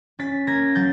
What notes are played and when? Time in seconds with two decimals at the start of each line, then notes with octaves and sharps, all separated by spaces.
0.19 C#4 A6 B6
0.47 A#3 G#6 A#6
0.75 F#3 G6 A6